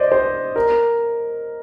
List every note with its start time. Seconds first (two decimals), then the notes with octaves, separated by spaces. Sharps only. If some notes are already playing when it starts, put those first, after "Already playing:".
Already playing: C5 D5 D#5
0.12 C5
0.56 A#4